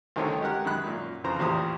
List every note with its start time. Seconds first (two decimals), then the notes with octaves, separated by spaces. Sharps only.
0.16 C2 D3 D#3 A3 C#4 C5
0.41 G#3 G4 A#4 F#5
0.65 F#2 D#3 G#3 B5 F#6
0.84 F#2 A#2
1.24 F2 C#3 E3 F3 C5 A#5
1.39 A1 E2 A#2 G4 C5 D#6